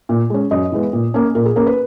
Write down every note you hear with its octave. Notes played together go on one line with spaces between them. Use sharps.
A#2
G#3 C#4
F#2 D#5
E3 G#3 B3
A#2
A#3 C#4
A#2 A#4
G#4
A#3 C#4 A#4
B4